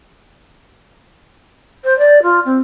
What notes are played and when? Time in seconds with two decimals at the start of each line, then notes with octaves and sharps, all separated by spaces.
1.83 C5
1.98 D5
2.22 F4
2.45 C4